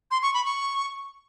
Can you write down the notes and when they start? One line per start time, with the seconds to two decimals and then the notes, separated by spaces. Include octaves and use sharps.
0.11 C6
0.22 C#6
0.34 B5
0.45 C#6